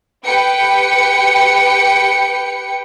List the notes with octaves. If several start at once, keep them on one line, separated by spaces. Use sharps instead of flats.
G4 B4 G5 C#7